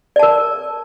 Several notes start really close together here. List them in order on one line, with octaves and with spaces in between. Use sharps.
D5 A5 A#4